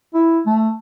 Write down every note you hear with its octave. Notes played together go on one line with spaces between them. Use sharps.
E4
A3